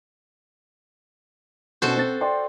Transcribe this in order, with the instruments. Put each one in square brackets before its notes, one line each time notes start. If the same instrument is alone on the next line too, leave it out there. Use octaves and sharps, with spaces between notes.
[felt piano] B2 C#4 [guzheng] F#4 A4 C5
[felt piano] C4 A6
D5 G5 C6